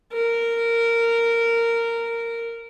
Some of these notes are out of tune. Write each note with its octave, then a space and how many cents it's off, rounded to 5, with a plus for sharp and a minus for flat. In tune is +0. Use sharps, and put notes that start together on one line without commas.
A#4 -10